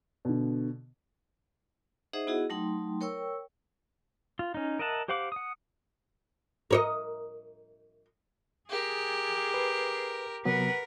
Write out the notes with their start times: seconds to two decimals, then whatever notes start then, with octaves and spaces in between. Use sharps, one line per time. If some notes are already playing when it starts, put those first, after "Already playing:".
0.25 B2 D3
2.13 D#4 G#4 C5 D#5 E5 F#5
2.27 B3 E4 F#4 G#4 D#5 F#5
2.50 F#3 A3 D#4 G5 C6
3.01 A#4 C#5 G5 C#6 E6
4.39 F4
4.54 C#4 D#4
4.79 A#4 D#5 E5 F#5 A5
5.08 G4 C5 F5 F#5 D6
5.32 F#5 D#6
6.71 A#4 C#5 D#5
8.70 G4 G#4 A#4
9.54 B4
10.45 C3 F#3 B3 A#4 B4 F#5